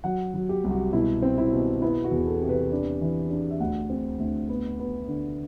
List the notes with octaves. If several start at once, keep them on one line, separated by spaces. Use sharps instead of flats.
F#3 F#5
F#3
G4
C2
F#4
B2 E4
C4
E4
B2
B3 E4
F#4
E2
A4
C3
B4
D4
E3
D4
E5
D2 F#5
C4
D2
B3
B3
D3